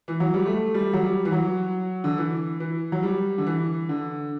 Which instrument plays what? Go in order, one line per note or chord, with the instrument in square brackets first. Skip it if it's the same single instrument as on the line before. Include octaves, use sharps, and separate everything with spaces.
[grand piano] E3
F#3
G3
A3
G3
F#3
G3
E3
F#3
D3
E3
E3
F#3
G3
D3
E3
D3